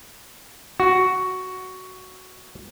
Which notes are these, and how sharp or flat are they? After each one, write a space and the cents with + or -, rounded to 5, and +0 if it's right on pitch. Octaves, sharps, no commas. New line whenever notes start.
F#4 +5